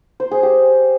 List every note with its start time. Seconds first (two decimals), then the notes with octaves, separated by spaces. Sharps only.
0.20 C5
0.31 G#4
0.43 G4